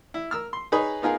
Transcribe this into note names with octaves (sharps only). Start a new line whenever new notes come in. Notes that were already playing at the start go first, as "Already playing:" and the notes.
E4
A#4 E6 F6
C6
D#4 G#4 B4 C#5 D#5
B3 D#4 F4 G#4 A#4